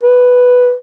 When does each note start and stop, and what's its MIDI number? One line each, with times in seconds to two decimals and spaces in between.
0.03 0.73 71